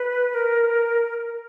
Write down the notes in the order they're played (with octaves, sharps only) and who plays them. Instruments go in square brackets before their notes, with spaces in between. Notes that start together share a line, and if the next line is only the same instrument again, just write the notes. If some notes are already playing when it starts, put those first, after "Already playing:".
Already playing: [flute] B4
A#4